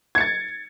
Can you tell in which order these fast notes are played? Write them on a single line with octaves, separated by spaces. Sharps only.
G#6 C#7 A6